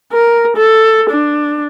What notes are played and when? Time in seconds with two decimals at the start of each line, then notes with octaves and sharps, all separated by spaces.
0.12 A#4
0.57 A4
1.10 D4